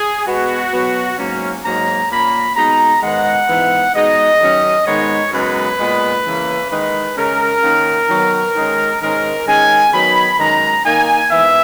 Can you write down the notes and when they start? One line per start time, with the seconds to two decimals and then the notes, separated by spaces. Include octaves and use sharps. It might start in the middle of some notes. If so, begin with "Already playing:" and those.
Already playing: G#4
0.26 B2 G#3 B3 F#4
0.73 B2 F#3 B3
1.18 G#2 F#3 A#3 C#4
1.65 G#2 F#3 A#3 D#4 A#5
2.10 A#2 A#3 C#4 B5
2.56 B2 G#3 D#4 A#5
3.02 G#2 D#3 G#3 B3 F#5
3.49 G#2 E3 B3 D#4
3.95 B2 G#3 D#4 D#5
4.40 D#3 F#3 C#4
4.87 G#2 D#3 G#3 B3 D#4 C#5
5.32 F#2 C#3 G#3 B3 D#4 B4
5.79 A#2 G#3 B3
6.26 C#3 E3 A#3 C#4
6.71 D#3 G#3 D#4 B4
7.17 C#3 G#3 C#4 A#4
7.63 D#3 A#3 C#4
8.09 D#3 F#3 B3
8.56 D#3 G#3 C#4
9.01 G#2 D#3 G#3 C#4 A#4
9.47 D#3 G#3 C#4 G#5
9.93 D#3 F#3 B3 D#4 B5
10.39 F#2 D#3 G#3 D#4 A#5
10.85 D#3 A#3 D#4 G#5
11.31 G#2 E3 B3 E5